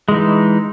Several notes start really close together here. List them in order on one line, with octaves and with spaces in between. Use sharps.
G#3 E3 D#4